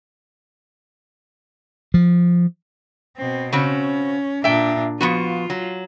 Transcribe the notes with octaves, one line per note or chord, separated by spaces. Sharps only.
F3
B2 C4
C#3 C4 C#4 F#4
A#2 D4 E5 G5
F3 B3 F4 F#4
F#3